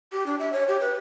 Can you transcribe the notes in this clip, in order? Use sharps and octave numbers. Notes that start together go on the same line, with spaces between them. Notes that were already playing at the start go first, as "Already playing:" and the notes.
G4
D4
E5
C#5
G4
B4